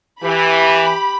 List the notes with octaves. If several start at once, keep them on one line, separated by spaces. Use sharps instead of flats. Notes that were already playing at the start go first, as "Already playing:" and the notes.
E3 G4 B5